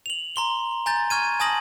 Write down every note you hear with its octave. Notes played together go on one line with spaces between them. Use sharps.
F7 F#7
A#5 C6 G7
G#5 A#5 G6 A6
C#6 F6 G#6 D#7
G#5 A5 D#6 A#6 F#7